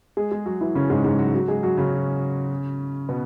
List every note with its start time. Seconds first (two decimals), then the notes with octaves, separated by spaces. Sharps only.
0.17 G#3 G#4
0.31 G#3 G#4
0.46 F#3 F#4
0.61 E3 E4
0.75 C#3 C#4
0.90 G#2 G#3
1.04 G#2 G#3
1.19 F#3 F#4
1.33 F#3 F#4
1.48 G#3 G#4
1.63 F#3 F#4
1.77 C#3 C#4
3.09 B2 B3